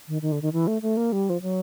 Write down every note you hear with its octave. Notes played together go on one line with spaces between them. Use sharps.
D#3
D#3
D3
D#3
E3
A3
A3
A#3
G3
F3
F#3